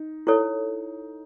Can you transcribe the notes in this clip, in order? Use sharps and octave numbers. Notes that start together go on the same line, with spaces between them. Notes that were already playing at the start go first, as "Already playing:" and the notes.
Already playing: D#4
E4 A4 C#5